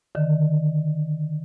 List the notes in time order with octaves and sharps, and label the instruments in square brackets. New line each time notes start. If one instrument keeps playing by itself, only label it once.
[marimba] D3 D#3